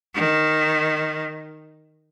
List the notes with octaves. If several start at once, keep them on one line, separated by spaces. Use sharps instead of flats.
D#3